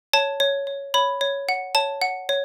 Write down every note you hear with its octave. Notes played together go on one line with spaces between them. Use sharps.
C#5 A5
C#5
C#5
C#5 B5
C#5
F#5
C#5 A5
F#5
C#5